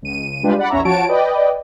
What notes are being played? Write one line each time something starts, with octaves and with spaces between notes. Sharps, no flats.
C#2 D#7
G3 G#3 D4 F4 G4 B4
D5 F#5 B5
A#1 E2 C#4 C#5 E5 A#5
F3 F#4 C#5 A5 D7
B4 D5 D#5 G5